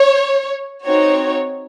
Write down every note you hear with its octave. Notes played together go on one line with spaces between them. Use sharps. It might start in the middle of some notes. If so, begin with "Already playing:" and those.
Already playing: C#5
C4 D#4 F#4 C#5